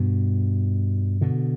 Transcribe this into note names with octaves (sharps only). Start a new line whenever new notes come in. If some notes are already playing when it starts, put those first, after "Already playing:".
Already playing: G2 B2
B2 D3